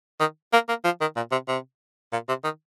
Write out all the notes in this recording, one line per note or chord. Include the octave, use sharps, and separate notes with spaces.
D#3
A#3
A#3
F3
D#3
A#2
C3
C3
A#2
C3
D#3